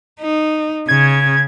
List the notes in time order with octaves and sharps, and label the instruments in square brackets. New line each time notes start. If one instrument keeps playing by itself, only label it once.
[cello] D#4
[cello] C#3 [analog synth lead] G#6